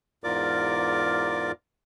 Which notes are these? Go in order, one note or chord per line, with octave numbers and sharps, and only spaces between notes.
E2 G#2 F4 A#4 D5 D6